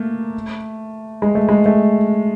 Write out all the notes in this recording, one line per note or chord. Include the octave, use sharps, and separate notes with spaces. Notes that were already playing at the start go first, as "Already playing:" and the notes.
Already playing: A3 A#3
G#3
A3
G#3
A3